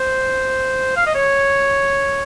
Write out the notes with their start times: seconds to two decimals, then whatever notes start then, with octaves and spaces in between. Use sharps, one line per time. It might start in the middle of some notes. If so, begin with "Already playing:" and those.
Already playing: C5
0.96 F5
1.06 D#5
1.14 C#5